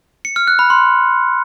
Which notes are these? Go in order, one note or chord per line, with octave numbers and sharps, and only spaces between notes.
C#7
F6
F#6
B5
C6